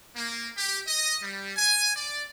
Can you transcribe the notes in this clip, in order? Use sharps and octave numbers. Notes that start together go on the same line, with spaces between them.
A#3
G4
D#5
G3
G#5
D5